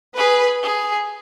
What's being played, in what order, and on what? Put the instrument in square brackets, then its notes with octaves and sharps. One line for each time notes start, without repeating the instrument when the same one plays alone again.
[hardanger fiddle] G#4 [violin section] B4
[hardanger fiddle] G#4